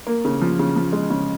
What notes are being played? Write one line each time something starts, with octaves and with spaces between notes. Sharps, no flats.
A#3
C#3
F3
C#3
F3
G#3
C#3